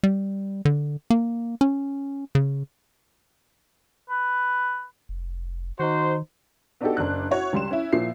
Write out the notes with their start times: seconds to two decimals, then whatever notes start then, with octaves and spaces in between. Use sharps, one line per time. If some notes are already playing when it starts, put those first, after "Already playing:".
0.03 G3
0.65 D3
1.10 A#3
1.61 C#4
2.35 C#3
4.10 B4
5.09 F1
5.79 D#3 D#4 F#4 C5
6.81 B3 D4 D#4 F#4 G4 A4
6.97 F#1 D4 F#6
7.31 E4 F#4 C#5
7.52 C#2 G3 C6 E7
7.71 C#4 E4
7.93 A#2 F3 E4 C7